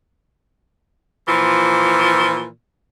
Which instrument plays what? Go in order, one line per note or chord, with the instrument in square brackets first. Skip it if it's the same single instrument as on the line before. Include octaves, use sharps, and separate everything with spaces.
[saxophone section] A#2 E3 F3